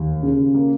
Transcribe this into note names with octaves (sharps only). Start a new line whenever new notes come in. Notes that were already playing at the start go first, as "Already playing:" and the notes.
Already playing: D#2
C#3
A#3